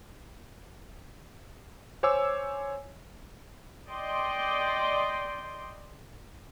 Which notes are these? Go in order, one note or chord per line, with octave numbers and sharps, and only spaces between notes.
C5 C#5 G#5 D6 E6
D5 D#5 G5 C6